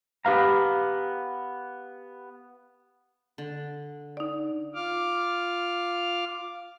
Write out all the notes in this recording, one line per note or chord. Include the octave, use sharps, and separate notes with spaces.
B3 G4 B4 F5 A#5
D3
D#4 D5
F4 F5 D6 F6